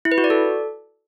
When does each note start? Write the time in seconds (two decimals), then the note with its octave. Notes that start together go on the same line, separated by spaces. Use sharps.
0.05 E4
0.12 B4
0.18 F#4
0.24 D5
0.30 A4